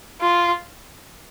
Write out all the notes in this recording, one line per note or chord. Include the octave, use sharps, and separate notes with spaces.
F4